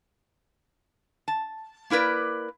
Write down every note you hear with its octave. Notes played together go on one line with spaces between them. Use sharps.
A5
A#3 E4 A#4 B4 D5